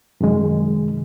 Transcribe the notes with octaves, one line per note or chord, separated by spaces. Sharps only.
F#2 C3 D#3 G#3